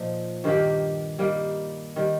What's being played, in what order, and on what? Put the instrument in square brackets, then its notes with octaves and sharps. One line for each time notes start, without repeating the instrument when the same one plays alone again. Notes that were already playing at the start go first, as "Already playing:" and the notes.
Already playing: [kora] A#2 F3 D#4
G2 D#3 A#3 G4
G3 A#3 D#4
D#3 G3